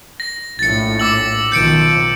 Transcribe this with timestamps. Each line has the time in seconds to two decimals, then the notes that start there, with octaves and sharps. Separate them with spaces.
0.20 A#6
0.59 A#1 A2 A6 C#7
1.00 D6 E6 F#7
1.52 B1 D#3 F3 G6 C#7 D7